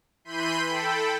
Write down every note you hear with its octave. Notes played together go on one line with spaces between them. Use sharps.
E3 B5 C6 G6 D#7
A4 G5 B5